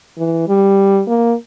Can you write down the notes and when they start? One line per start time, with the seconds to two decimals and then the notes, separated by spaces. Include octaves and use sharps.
0.18 E3
0.48 G3
1.08 A#3